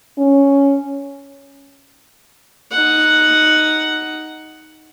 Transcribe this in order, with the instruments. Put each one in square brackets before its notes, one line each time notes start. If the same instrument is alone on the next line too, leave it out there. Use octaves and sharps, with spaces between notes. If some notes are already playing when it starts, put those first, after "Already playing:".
[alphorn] C#4
[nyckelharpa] D#4 F#5